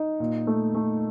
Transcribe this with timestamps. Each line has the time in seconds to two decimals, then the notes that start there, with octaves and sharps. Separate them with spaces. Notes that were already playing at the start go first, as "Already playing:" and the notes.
Already playing: D#4
0.20 A#2
0.47 A3
0.75 A3